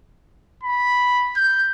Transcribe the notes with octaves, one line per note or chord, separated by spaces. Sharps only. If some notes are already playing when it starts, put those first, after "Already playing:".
B5
G6